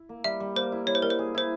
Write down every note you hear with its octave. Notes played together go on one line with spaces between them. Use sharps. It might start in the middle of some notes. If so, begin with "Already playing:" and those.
Already playing: E4
A#3
G3 E5
G3
A#3 C5
E4
G3 C#5
C5
G3 A#4
C5
G#4
E4 C5